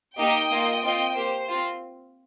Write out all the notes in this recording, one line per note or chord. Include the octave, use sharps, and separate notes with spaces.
A#3 D#4 G4 D#5 G5
A#3 F4
C4 F4 D#5 G5
A#3 G4 C5
C4 F4